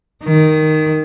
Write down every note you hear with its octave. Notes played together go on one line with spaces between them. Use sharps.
D#3